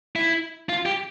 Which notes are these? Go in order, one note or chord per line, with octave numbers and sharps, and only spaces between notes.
E4
F4
G4